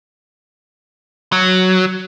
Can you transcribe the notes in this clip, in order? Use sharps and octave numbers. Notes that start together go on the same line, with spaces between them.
F#3